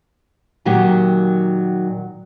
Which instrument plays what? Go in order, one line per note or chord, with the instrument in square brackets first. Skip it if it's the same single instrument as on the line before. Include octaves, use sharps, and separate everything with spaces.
[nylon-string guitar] A#2 D#3 F#3 G4